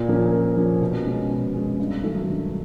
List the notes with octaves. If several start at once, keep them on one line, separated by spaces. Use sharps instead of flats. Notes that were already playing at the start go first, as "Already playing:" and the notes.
Already playing: A#2
F3 A#3 C#4
A#2
F3 A#3 C#4
B2
G#3 C#4
B2
G#3 C#4
G2
D#3 F#3 A3
G2